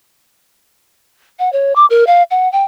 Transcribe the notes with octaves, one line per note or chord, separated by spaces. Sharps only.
F#5
C#5
D6
A#4
F5
F#5
G5